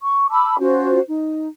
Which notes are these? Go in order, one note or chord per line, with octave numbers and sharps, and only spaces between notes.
C#6
A5 B5 D6 E6
C#4 F4 F#4 C5
D#4